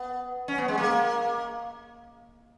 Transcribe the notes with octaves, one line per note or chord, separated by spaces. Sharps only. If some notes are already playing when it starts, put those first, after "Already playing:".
Already playing: B3
C#4
B3
G#3
A#3